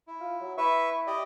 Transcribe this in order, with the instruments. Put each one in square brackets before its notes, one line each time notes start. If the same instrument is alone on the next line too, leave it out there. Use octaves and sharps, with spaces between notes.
[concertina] E4
[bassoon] F4
F#3
[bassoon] E4 [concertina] B4 E5 C#6
[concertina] G4 D5 D#5